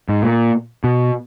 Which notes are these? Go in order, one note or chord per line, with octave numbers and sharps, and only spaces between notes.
G#2
A#2
B2